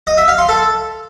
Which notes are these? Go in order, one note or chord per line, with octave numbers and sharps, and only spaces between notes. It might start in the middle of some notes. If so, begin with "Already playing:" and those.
D#5
E5
F5
C6
A4